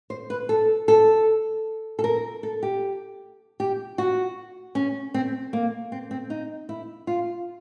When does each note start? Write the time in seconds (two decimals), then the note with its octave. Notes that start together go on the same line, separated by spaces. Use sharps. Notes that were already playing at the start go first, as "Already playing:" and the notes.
0.10 C5
0.30 B4
0.49 A4
0.88 A4
1.99 A4
2.04 A#4
2.43 A4
2.63 G4
3.60 G4
3.98 F#4
4.75 C#4
5.14 C4
5.53 A#3
5.92 C4
6.11 C4
6.30 D#4
6.69 E4
7.07 F4